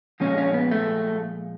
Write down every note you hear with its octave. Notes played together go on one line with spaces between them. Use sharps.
A#2 F3 G#3 C#4
C#4
B3
A3